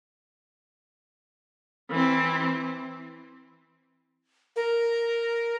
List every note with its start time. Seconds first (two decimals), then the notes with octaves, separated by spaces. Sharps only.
1.90 E3 C4
4.56 A#4